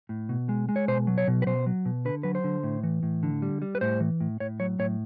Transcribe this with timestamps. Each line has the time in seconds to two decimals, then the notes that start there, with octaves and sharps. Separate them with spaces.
0.09 A2
0.29 B2
0.49 G#3
0.69 G#3
0.76 C#5
0.88 B2 C5
1.07 F#3
1.18 C#5
1.28 B2
1.42 B4
1.46 B2 C5
1.66 F#3
1.85 B2
2.05 D3 B4
2.23 F#3 B4
2.35 C5
2.44 D3
2.63 A2
2.83 E3
3.03 A2
3.23 D3
3.42 G3
3.62 G3
3.75 B4
3.81 A2 C5
4.00 E3
4.20 A2
4.40 A2 C#5
4.60 F#3 C#5
4.79 A2 C#5